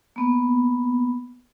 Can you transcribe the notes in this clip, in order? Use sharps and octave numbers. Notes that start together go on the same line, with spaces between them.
A#3 B3